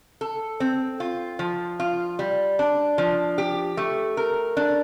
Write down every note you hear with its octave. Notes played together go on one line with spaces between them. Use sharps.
A4
C4
F4
F3
F4
G3
D4
F3
G4
A3
A#4
D4